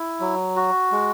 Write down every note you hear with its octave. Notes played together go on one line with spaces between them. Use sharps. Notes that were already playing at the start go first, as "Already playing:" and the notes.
Already playing: E4
F#3
F#4
G#3